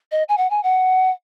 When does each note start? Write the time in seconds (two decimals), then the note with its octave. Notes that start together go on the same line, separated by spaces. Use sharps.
0.12 D#5
0.29 G#5
0.38 F#5
0.50 G#5
0.63 F#5